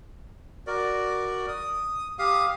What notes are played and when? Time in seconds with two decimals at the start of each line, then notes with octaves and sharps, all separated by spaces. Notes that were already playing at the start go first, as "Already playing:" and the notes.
0.67 F#4 A#4 D5
1.48 D#6
2.19 G4 F5 D#6